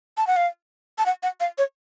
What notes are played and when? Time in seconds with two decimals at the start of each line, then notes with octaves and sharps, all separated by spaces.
0.17 A5
0.27 F#5
0.36 F5
0.98 A5
1.06 F#5
1.23 F#5
1.40 F5
1.58 C#5